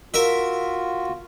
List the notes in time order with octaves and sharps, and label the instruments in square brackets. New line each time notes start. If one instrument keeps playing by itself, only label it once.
[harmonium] F4 F#4 [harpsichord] A#4 E5